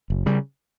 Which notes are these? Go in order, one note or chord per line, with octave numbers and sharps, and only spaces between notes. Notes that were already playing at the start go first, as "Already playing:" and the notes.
F#1
C#3 G3